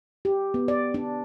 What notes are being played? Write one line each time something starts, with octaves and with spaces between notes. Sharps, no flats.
G4
B3
D5
D4